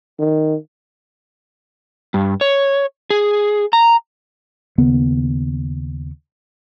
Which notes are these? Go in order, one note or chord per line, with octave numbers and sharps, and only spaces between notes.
D#3
G2
C#5
G#4
A#5
D#2 C#3 B3